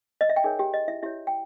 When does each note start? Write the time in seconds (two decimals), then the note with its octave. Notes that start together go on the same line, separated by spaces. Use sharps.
0.21 D#5
0.29 E5
0.36 G5
0.44 D#4 G#4 A#4 C#5 G#5
0.59 G4 G5
0.74 D#5
0.88 E4 E5
1.03 E4 G4 C#5 E5
1.27 G5